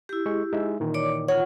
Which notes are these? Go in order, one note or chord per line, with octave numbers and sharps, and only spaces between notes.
E4 G4
G#3 G#4 C#6
G#3 D#4 E5
A#2 D#3 E3
C#5 D5 D6
F4 C#5 F#5